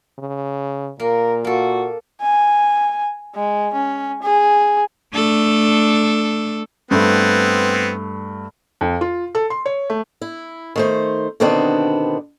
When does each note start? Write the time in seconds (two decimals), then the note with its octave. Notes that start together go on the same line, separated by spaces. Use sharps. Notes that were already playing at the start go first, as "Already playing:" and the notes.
0.19 C#3
1.00 A#2 A#3 A#4
1.44 A#3 F#4 A4
2.21 G#5
3.35 G#3
3.74 C#4
4.22 G#4
5.13 A3 D4 A4
6.91 G2 A3 B3 C4
8.81 F2
9.01 F4
9.35 A4
9.50 C6
9.66 C#5
9.90 A3
10.22 E4
10.76 D#3 A3 C5
11.40 B2 D3 D#3 B3 C4 D4